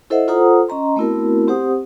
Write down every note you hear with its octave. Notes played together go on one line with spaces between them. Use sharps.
E4 A4 C5 D#5 E5 F#5
F4 A4 C5 F#5 A#5 D#6
C#4 D#5 A#5 C6
A3 B3 C4 E4 F#4 A#4
C4 G4 C5 F#5 D#6